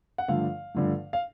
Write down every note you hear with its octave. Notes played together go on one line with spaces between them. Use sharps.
F#5
G2 D3 F3 A3 F5
G2 D3 F3 A3
F5